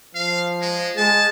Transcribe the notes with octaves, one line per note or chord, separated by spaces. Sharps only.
F3 F5
G#3
G#3 A5